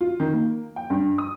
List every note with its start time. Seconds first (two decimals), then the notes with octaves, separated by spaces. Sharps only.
0.01 F4
0.20 D#3
0.33 A#3
0.76 G5
0.90 G2
1.18 D#6